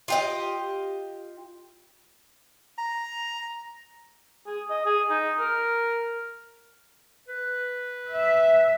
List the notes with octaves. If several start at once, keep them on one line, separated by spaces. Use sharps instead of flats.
F4 G4 D#5
A#5
G#4
D#5
G#4
D#4
A#4
B4
E5